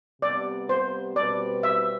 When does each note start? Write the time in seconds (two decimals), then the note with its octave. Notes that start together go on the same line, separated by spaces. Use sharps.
0.22 C3 G3 B3 D5
0.69 C5
1.16 B2 G3 C4 F#4 B4 D5
1.63 E5